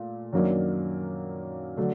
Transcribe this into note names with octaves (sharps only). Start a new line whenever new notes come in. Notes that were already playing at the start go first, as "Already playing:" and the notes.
Already playing: A#2 A3
F#2 D#3 F#3 A#3 D4
D3 F#3 A3 D4